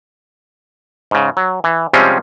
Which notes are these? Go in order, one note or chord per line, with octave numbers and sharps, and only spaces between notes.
G#2 C#3
F#3
E3
C3 F3 G3 G#3 C4 C#4